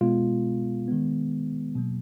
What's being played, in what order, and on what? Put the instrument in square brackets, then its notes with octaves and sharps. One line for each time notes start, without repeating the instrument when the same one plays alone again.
[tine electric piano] B2 G#3 B3 F4
D#3 G#3 B3
B2 F#3 A#3